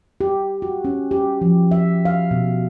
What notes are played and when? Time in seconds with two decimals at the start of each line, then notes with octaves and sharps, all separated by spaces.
0.21 G4
0.62 F#4
0.85 C#4
1.11 G4
1.41 F3
1.71 E5
2.05 F5
2.31 B2